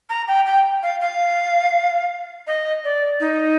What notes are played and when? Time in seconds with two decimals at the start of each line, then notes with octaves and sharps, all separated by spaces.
0.09 A#5
0.28 G5
0.46 G5
0.83 F5
1.01 F5
2.47 D#5
2.84 D5
3.20 D#4